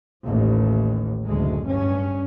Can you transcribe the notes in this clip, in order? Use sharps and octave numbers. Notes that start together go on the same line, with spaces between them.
A1 D#2
F#1 D2 G#3
G2 C#4